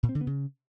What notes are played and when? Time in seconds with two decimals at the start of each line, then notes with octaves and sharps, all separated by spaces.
0.03 A#2
0.09 C4
0.15 D3
0.21 B3
0.27 C#3